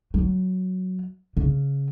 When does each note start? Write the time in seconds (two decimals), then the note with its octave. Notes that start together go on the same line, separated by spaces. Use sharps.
0.14 F#3
1.37 C#3